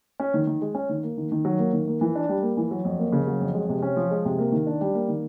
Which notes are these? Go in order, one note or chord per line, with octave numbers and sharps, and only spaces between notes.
C#4
D#3
D#3
G#3
C#4
D#3
A#3
D#3
D#3
F#3
A#3
D#3
A#3
E3
D4
G3
A#3
E3
F#3
F2
A#3
C#3
F#3
F2
G#3
C3
C#4
F3
G#3
C3
A#3
D#3
D4
G3
A#3
D#3